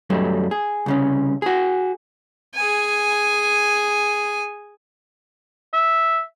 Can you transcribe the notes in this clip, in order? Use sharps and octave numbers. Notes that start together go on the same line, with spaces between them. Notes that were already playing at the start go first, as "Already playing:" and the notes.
F#2 F#3 G3 A3
G#4
C2 C#3 C#4
F#4 G#4
G#4 G#5
E5